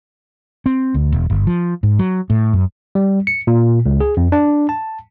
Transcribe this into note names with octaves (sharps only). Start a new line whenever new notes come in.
C4
D2
E1
G1
F3
G#2
F#3
A2
F#2
G3
C#7
A#2
C#2
G#4
F2
D4
A5